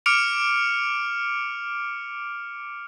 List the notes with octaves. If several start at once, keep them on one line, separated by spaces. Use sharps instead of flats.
D6 F6 C#7 D7 F7